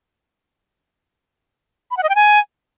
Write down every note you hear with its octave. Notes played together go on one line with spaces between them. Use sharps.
B5
F#5
D#5
G5
G#5